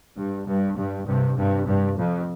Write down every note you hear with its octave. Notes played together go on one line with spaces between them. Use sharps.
G2
G2
G2
G2 C3
G2 C3
G2
F2